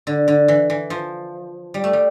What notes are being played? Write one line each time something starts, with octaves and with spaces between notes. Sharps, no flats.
D3
D3
E3
E3
F3
G3
A3
G3